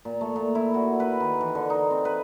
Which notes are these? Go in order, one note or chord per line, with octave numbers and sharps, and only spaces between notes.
A#2
A3
A#2
E4
F#4
B4
D#3
E3
D3
D#4
C4
B4